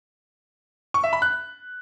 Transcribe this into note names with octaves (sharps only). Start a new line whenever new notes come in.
C#6
E5
B5
F#6